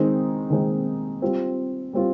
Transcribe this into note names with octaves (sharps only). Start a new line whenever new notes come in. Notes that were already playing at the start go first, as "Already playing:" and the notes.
Already playing: D#3 G#3 C4 D#4
D#3 G#3 C4 D#4
G3 C4 F4
G3 C4 F4